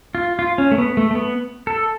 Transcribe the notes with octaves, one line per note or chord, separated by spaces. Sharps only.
F4
F4
C#4
A3
B3
A3
A3
B3
A4